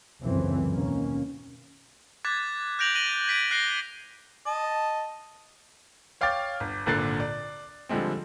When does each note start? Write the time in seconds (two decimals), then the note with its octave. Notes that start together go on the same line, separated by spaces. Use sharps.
0.23 G1 C#2 F#2 D3 E3 C4
0.72 D#2 B2 A#3 C#4
2.25 D6 F#6 G#6 A6 B6
2.79 F#6 G6 A#6 D7 F7 F#7
2.95 A#6 D#7 F#7 G7
3.28 G#6 B6 D7
3.51 F#6 A#6 C7 G7
4.46 D#5 A5
6.21 C#5 F5 G5 D6 A6
6.60 G1
6.86 G#1 A#2 D3 F#6 A6 C7
7.20 D5
7.89 D3 F3 G3 G#3 C4